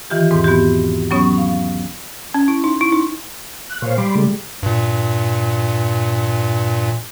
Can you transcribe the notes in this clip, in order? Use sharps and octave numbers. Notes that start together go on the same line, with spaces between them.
D#3 E3 F4 G4
E2 G#2 B2 C4
B3 F#4 G4
F#3 B3 C#4 C#5 C#6 D#6
F5
C#4
E4
D#4
E4
D#4
F#6
A#2 C5 C#5 F5
G3 B5 C6 D6
C#3 G#3 A3
G2 A#2